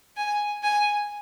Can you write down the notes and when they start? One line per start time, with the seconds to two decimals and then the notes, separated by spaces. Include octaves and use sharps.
0.17 G#5
0.63 G#5